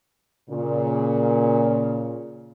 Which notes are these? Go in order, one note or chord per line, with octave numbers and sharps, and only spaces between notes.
A#2 C#3